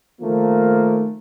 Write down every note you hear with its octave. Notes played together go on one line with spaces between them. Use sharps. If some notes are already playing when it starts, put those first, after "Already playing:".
D#3 F3 A3 A#3